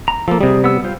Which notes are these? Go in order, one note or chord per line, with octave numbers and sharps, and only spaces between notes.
A#5
F3 A#3 A4
C3 G3 G#4
B3 E6
G3 F4 C5